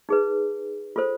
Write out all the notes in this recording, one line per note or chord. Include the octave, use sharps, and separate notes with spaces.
D#4 G#4 B4
F4 A4 C5